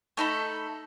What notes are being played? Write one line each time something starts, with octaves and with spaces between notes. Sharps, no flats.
A3 D#4 A4 B5